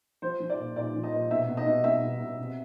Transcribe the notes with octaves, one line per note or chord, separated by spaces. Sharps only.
F3 C5
F3
D5
A#2
A#2 D5
F3
D#5
A#2
B2 E5
B2
D#5
B2
B2 E5
B2
B2
C3